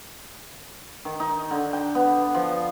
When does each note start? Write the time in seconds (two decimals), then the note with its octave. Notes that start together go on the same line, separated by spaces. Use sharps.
1.05 D#3
1.20 D#4
1.51 D3
1.73 G5
1.95 B3
2.35 F3